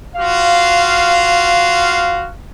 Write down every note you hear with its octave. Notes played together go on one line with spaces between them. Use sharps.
F4 F#4 F5